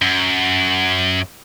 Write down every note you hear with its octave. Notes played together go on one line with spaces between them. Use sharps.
F#2